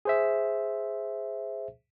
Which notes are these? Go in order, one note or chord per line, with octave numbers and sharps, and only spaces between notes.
G#4 C5 E5